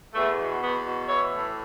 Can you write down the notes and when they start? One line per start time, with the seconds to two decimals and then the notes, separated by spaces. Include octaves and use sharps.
0.14 E2 A3
0.38 B2
0.61 E2 B3
0.85 B2
1.07 E3 C#5
1.30 A2